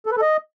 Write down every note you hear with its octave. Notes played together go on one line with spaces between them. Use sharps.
A4
B4
A4
D#5